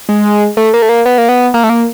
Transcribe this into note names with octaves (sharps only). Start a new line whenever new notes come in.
G#3
A3
A#3
A3
A#3
B3
A#3
B3
A#3
A3
A#3